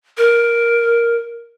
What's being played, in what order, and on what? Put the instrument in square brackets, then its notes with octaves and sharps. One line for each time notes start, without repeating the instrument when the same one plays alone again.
[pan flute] A#4